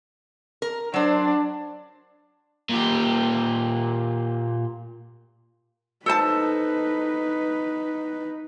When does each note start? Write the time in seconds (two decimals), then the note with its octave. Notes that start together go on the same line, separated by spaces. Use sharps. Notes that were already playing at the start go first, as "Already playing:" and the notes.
0.62 A#4
0.94 F#3 D4 C5
2.70 A#2 G4
6.06 D#4 A4 B4 C5 A5